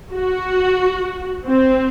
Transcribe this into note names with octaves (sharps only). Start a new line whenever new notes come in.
F#4
C4